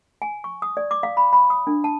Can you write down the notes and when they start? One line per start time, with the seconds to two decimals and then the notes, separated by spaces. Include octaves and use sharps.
0.22 G#5
0.44 C#6
0.62 D#6
0.77 D5
0.91 D6
1.03 F5
1.17 B5
1.33 B5
1.50 D#6
1.67 D4
1.84 A5